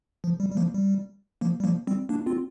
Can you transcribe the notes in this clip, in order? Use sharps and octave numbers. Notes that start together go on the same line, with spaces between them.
F3
G3
G3
F3 A#3
G3
F3 A#3
G3
F3 A#3
G3 C4
A#3 D4
C4 F4